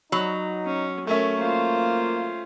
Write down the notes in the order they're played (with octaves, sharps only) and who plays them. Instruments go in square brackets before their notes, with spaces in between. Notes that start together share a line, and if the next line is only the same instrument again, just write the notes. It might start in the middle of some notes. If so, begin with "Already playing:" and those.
[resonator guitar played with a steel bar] F#3 [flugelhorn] D#4 [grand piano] B5
[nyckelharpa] C#4
[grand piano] A3 C#4 E5 [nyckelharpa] A#4
[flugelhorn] A#3 [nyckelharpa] F4 C5